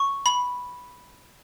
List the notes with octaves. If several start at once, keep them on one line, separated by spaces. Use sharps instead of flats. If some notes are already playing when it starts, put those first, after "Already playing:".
Already playing: C#6
B5